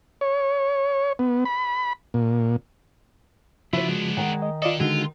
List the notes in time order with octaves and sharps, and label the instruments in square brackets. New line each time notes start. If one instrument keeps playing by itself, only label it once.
[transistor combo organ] C#5
B3
B5
A#2
[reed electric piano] C#3 F3 [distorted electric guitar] B3 D4 [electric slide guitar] E4 [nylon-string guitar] F#4 C5
[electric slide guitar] G#3
[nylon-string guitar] D#3 G#5 [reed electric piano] F#5
[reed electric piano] D#5
[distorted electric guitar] D4 A4 [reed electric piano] F4 D5 D#5
[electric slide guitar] D3 G#3 [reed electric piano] D#4 F#4 [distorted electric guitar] F4